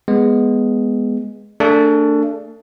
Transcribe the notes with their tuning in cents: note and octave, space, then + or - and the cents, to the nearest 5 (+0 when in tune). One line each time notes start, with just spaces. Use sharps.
G#3 +0 B3 +0
A3 +40 D4 +0 G#4 +25